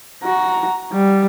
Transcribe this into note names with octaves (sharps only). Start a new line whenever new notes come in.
F#4 A#5
G3